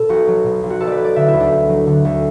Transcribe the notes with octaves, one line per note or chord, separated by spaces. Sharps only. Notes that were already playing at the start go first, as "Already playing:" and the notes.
Already playing: B2 A4
B1 F#4
F#3
B2
B1
F#4
B1 A4
B4 D5
F#3
D5
D3 E5
E4
D2
D4
D2
F#3
D3
D2